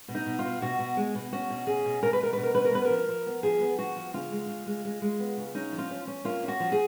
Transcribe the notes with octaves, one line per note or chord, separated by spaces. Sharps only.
B2
D#4
B2
F4
B2
B2 F#4
B2
G#3
B2
C#4 F#4
B2
C#4 G#4
B2
B2 A#4
B4
B2 A#4
B2 B4
A#4
C#4 B4
A#4
B3 B4
A#4
F3
F3
B3
F3 G#4
B3
F3 F#4
F3
C#3 F4
G#3
C#3
G#3
G#3
G#3
B3
C#3
C#4 D#4
F3
F4
C#4
C#4
A#3 F4
C#4
F#4
F3
G#4